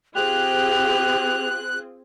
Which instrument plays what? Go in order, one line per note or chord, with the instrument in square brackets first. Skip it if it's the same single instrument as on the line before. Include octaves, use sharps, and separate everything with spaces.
[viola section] C4 F4 G#4 [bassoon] G4 [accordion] F#6 [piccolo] F7